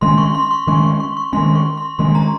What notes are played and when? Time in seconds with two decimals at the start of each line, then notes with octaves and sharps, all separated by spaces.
0.01 D#3 G#3 C#4 C6
0.18 C#6
0.35 C6
0.51 C#6
0.67 D#3 G#3 C#4 C#6
0.83 C#6
1.00 C#6
1.17 C#6
1.33 D#3 G#3 C#4 C6
1.55 C#6
1.77 C6
1.99 D#3 G#3 C#4 C6
2.15 A#5